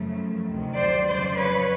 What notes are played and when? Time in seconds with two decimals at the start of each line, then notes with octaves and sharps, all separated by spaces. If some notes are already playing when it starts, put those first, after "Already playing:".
Already playing: F#2 C#3 F3 A3
0.47 D2 C3 D#3 F#3
0.76 C5 D5
1.07 F2 C#3 F#3 C5 D5
1.37 B4 C#5